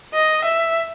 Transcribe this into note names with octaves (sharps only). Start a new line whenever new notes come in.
D#5
E5